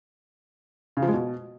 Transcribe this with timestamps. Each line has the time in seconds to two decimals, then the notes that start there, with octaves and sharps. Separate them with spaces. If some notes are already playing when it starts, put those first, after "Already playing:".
0.97 C#3
1.02 F3
1.08 G#3
1.14 B2